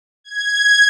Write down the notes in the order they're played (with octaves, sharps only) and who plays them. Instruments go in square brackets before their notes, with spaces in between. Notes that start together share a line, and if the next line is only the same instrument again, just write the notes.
[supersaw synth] G#6